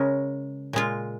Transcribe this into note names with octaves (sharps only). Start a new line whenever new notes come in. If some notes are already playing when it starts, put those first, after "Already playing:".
Already playing: C#3 G#3 C#4 A#4
A#2 G#3 F4